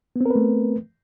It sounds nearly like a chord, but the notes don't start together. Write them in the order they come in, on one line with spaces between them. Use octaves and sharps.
B3 C4 A#4 B4 A3